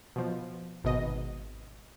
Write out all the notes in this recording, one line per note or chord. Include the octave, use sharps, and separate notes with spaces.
B2 F3
G#1 B2 D#5